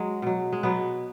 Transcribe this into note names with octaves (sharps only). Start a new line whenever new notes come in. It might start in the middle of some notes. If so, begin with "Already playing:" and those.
Already playing: F#3 G#3
B2 F#3
G#3
B2 F#3 B3